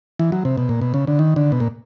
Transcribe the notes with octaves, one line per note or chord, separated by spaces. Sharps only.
E3
F#3
C3
B2
A#2
B2
C#3
D3
D#3
D3
B2
A#2